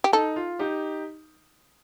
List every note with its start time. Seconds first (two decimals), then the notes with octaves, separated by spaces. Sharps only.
0.04 G4
0.13 D#4 A4
0.36 F4
0.59 D#4 G4